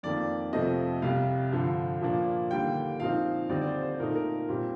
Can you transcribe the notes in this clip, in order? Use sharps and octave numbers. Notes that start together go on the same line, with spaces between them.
F2 D#3 A#3 D5
F2 C3 F3 A3 C4 D#5
C2 C3 G3 F5
G2 D3 F3
A#2 F3 A#3 D4
D#2 D3 G3 A#3 G5
A#2 F3 C4 D#4 F5
D#2 D3 G3 C4 D#4 D5
D5
C5
C5
A#2 A3 D#4 A#4
A#4
A#2 G3 C4